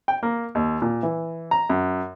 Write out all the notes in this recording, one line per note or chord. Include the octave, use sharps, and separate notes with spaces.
G5
A#3
D#2
A#2
E3
A#5
F#2